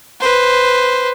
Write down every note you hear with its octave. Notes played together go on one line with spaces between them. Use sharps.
B4 C5